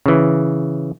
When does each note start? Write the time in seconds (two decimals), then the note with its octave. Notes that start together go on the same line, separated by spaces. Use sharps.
0.06 C#3 E3